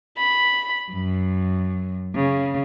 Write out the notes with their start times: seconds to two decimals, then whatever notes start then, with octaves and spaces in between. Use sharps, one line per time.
0.18 B5
0.93 F#2
2.16 C#3